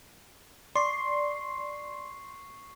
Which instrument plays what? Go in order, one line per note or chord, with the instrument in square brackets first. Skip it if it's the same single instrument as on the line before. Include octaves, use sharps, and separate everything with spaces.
[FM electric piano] D5 [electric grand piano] C6 [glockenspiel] C#6 C7